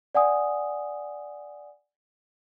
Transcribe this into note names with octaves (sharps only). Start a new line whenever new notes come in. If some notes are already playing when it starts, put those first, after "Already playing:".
D5 F#5 G#5 D#6